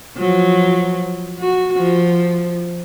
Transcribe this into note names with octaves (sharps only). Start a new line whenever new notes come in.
F3 F#3
F#4
F3